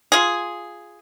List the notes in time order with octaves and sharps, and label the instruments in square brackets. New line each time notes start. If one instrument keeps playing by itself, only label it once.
[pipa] F4 G#4